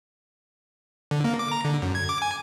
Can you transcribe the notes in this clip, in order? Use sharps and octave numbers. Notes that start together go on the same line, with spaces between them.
D3
A#3
D6
A#5
D3
F#2
G#6
D6
G#5